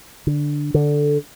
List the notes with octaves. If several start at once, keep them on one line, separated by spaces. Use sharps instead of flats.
D3
D3